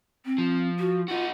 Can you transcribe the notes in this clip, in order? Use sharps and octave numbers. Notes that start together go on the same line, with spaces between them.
C4
F3
F#4
D#4 F4 F#4